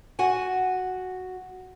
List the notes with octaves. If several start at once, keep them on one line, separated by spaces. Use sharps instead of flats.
F#4 F#5 G#5